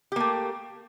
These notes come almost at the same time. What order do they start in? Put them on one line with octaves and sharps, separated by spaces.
G4 A#3 A3